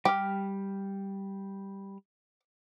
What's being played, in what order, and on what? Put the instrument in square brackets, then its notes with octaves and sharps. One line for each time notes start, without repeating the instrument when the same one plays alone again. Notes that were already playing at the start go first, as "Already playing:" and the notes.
[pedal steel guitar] G3 F6 [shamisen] G4